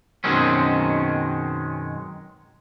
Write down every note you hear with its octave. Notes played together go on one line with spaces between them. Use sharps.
F#2 B2 D#3 G#3 C4 C#4